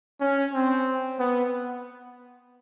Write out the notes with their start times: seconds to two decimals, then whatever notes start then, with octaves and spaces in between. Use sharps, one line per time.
0.21 C#4
0.53 C4
1.19 B3